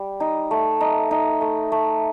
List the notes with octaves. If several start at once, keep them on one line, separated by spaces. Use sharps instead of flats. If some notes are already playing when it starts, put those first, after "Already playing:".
Already playing: G3
D#4
A3
D#4
D#4
A3
A3